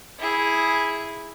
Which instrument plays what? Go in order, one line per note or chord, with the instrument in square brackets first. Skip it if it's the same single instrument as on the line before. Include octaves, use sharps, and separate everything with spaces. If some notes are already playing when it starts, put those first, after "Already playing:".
[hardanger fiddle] E4 G#4